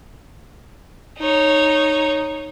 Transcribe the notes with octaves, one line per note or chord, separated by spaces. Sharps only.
D#4 C#5